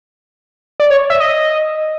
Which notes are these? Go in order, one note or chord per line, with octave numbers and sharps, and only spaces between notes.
D5
C#5
E5
D#5